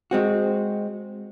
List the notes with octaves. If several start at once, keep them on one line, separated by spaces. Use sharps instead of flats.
G#3 C4 F#4